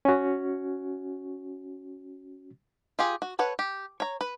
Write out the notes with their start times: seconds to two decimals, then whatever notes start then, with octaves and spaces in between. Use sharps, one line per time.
0.05 C#4 F#4
2.99 F4 G4 G#4
3.22 F#4
3.39 A4 B4 C#5 F#5
3.59 G4
4.00 C#5 A#5
4.21 B4